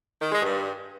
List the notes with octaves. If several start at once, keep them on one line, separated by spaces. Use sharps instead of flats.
D#3
G#3
G2